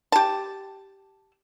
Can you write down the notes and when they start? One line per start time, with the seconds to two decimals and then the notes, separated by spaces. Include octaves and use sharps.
0.12 G4 A5